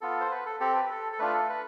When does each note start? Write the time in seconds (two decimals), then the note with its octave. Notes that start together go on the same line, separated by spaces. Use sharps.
0.01 B3 F4 A4
0.21 C5
0.31 B4
0.46 A4
0.60 C4 G4 A4
0.76 B4
0.91 A4
1.12 A4
1.19 A3 D4 F4 B4
1.34 A4
1.49 B4